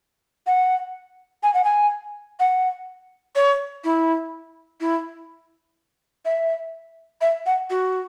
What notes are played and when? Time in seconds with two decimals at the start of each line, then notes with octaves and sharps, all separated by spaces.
0.47 F#5
1.43 G#5
1.54 F#5
1.64 G#5
2.40 F#5
3.36 C#5
3.84 E4
4.80 E4
6.25 E5
7.21 E5
7.46 F#5
7.70 F#4